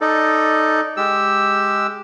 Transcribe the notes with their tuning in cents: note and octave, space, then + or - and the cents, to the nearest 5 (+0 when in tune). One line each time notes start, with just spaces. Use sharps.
D#4 +0 A4 +0 D5 +0
G#3 +0 G4 +0 E6 +0